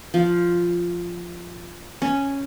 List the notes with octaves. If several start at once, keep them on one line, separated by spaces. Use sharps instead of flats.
F3
C#4